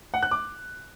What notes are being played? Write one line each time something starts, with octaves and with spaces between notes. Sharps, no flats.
F#5
F#6
D6